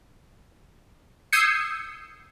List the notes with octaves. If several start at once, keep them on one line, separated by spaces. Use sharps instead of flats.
D#6 E6 G6 G#6 C7 C#7